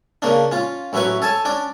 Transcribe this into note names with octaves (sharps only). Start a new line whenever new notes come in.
C#3 A#3 C#4 D4
C#4 F4
A1 F#3 C#4 E4 B4 C#6
A4 C#5 G#5 A5
C#4 D4 D5